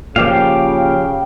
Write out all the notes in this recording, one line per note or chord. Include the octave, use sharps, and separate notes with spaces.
A#2 C#3 F3 G4 F5 G5